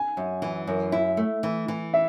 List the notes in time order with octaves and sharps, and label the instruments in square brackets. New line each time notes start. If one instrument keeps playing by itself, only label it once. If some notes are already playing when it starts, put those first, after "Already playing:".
Already playing: [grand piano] G#5
[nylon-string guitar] F#2
E3
F#2
E4
A3
E3
E3
[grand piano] E5